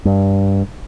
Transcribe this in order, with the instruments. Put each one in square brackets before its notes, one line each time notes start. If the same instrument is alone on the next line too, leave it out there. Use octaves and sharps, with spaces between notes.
[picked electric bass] G2